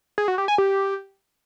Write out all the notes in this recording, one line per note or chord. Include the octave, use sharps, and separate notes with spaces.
G#4
F#4
G4
G#5
G4